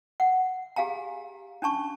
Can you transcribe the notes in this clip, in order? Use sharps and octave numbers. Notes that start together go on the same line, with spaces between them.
F#5
G4 G#4 F5 G#5 A#5
C#4 D4 A5 C#6